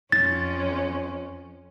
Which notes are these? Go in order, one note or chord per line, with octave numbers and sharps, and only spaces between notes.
F2 C#4 A6